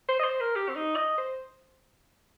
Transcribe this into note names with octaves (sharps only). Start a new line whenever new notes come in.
C5
D#5
C5
A#4
G4
C4
D#4
D#5
C5